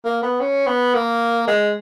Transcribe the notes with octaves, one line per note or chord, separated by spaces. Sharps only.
A#3
B3
C#4
B3
A#3
G#3